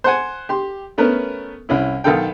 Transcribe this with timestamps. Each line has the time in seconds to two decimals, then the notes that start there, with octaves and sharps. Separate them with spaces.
0.04 C5 F#5 G#5
0.49 G4 C6
0.98 A3 B3 C#4 A#4 B4
1.69 C2 C#4 E4
2.04 B1 D#3 A4 F5 G5